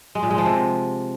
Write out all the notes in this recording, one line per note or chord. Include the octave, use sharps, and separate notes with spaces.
G#3
A#2
G#3
F3
C3